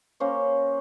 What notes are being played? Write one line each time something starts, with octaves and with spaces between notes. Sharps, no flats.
A#3 C#4 C5 C#5